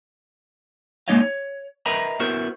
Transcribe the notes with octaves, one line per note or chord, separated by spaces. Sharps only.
G#3 A#3 D#4 C#5 D#5 F5
C#5
A#4 B4 D#5 E5 A#5 B5
B3 E4 F#4 A#4 C5